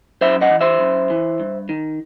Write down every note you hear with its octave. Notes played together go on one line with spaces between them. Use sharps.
F#2 C5 E5
D#5 F#5
E3
C5 E5
F#2
E3
G2
D#3